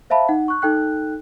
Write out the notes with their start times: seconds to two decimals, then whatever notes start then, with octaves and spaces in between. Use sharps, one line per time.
0.10 C5 E5 F5 A5 B5
0.29 D#4 F#5
0.48 C#6 F#6
0.62 D#4 A4 G5 F#6